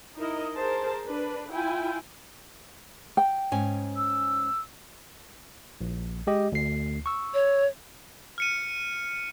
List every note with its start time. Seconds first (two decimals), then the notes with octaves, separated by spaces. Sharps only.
0.16 D#4 E4 A#4 D#5
0.56 G#4 A#4 C5 A5
1.07 D4 B4
1.51 E4 F4 G5 G#5
3.17 G5
3.52 G#2 C#4 G#5
3.97 E6
5.81 A#1
6.27 G#3 G4 D#5
6.52 D2 C7
7.06 C#6 E6
7.34 C#5
8.38 F6 C#7 D#7